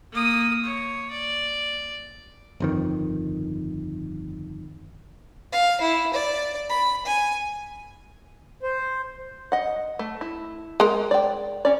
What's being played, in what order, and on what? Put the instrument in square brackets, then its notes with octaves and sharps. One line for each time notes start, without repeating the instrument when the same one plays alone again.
[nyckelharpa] A#3 D#6
C#5
D5
[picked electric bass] G1 F2 D#3
[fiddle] F5
E4
D5
B5
G#5
[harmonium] C5
[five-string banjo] D#5 F#5
A3
E4
[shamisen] G#3 A#4
[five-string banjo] D5 G5
C#4 D5